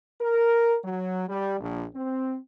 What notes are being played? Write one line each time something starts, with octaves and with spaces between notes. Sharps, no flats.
A#4
F#3
G3
A#1
C4